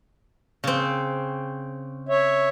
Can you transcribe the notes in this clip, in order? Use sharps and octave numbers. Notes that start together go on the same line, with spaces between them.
C#3 C4
C#5 E5